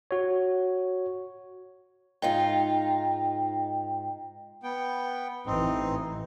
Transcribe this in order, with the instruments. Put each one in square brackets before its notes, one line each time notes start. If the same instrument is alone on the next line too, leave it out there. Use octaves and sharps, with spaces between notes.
[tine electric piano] F#4 C#5
[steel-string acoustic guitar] G#2 D#4 F4 [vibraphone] G5
[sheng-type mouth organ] B3 G5
[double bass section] A1 E3 [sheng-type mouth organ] C4 D#4